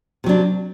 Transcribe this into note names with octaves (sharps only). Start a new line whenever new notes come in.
C3 F#3 D4